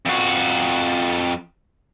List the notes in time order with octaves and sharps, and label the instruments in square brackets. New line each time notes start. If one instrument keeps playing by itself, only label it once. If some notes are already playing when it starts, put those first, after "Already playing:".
[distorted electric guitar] F2 F#4